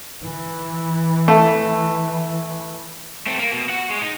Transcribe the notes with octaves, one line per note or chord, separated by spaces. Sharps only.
E3
A3
A3 C4
A#3
B2
F#4 F#5
G#3
D#4